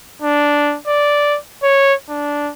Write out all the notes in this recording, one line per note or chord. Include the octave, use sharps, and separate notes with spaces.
D4
D5
C#5
D4